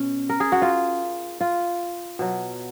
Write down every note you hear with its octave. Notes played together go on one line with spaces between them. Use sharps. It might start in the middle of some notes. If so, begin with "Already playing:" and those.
Already playing: B2 C#4
A#4
G#4
F#4
F4
F4
B2 F#3